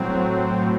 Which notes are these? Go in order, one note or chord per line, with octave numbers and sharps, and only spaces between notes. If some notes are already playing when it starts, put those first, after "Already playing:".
Already playing: A2 F#3 C4
A2